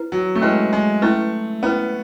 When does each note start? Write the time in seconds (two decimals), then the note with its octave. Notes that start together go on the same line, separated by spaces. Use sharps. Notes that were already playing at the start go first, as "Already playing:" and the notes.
Already playing: E4 B4
0.12 F#3
0.35 A3
0.42 G#3 C#4 E4 B4
0.73 G#3
1.02 A3 C#4 E4 B4
1.63 B3 C#4 E4 B4